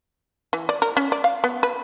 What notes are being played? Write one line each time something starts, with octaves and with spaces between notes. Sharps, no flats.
E3
D5
A#4
C#4
D5
F5
B3
B4